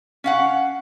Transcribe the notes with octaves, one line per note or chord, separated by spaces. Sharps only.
C#4 F5 F#5